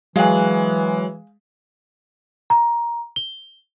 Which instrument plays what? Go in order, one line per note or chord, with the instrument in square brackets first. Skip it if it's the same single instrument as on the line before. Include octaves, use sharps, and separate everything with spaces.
[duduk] E3 [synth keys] F#3 F#6 [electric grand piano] G#3 [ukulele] F5 G#5
[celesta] A#5
G7